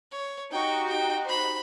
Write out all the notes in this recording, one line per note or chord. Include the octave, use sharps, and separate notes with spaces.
C#5
D#4 F#4 G4 G5 C#6
G5
C5 B5